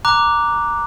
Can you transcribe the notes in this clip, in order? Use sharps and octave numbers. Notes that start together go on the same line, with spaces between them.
A#5 D6 F#6